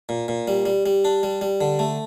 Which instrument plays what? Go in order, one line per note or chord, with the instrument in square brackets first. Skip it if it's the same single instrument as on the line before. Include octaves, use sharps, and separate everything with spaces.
[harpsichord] A#2
A#2
G3
G3
G3
D4
G3
G3
D3
A3